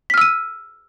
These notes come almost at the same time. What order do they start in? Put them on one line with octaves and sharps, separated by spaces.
B6 F6 E6 D#7